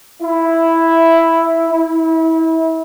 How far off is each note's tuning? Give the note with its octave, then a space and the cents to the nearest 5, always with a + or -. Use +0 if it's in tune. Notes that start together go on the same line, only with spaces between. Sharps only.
E4 +0
E4 -30